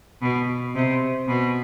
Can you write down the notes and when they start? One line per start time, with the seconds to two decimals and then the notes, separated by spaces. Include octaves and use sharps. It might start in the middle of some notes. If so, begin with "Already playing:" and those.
0.22 B2
0.75 C3
1.28 B2